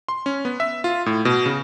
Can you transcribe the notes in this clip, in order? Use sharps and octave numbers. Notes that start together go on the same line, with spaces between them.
C6
C#4
B3
E5
F4
A2
B2
C#3